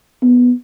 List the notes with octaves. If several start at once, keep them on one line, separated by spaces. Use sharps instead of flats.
B3